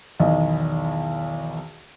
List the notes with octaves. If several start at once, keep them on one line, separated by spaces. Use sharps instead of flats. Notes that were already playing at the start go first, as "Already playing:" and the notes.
B1 E2 D#3 D#5